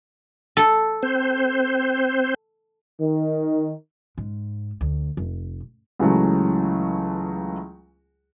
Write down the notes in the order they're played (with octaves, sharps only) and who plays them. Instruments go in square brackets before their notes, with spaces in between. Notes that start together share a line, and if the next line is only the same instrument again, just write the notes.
[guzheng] A4
[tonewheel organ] C4 C5
[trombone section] D#3
[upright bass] G#2
D2
F1
[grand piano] C#2 C#3 E3 F#3 A3